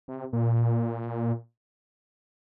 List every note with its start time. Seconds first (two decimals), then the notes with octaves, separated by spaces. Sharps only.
0.08 C3
0.33 A#2